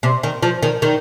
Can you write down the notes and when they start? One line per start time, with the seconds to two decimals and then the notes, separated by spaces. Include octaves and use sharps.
0.03 C3
0.23 D#3
0.43 F3
0.63 D#3
0.82 D#3